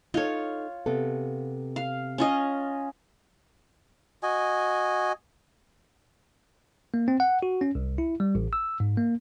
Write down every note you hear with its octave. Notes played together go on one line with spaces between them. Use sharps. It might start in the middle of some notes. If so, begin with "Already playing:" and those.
D#4 F4 A4 C#5
C3 B3 A4
F5
C#4 F4 D#5
F#4 D#5 G#5
A#3
C4
F#5
F#4
C#4
C2
E4
G3
A1
E6
G#2
A#3